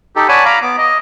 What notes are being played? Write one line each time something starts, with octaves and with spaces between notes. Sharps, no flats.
D#4 G4 A4
C#5 D5 F#5 G#5 A5 B5
F5 A#5 B5 D6
B3 D6
D#5